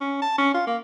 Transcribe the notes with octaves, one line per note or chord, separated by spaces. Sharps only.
C#4
A5
C#4
F4
A#3